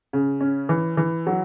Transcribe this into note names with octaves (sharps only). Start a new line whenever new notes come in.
C#3
C#4
E3
E3
F#3